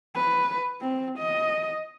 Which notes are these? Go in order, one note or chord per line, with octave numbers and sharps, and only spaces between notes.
B4
C4
D#5